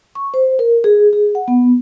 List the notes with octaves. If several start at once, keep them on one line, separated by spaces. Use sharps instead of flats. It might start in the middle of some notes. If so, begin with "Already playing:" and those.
C#6
C5
A#4
G#4
G#4
F#5
B3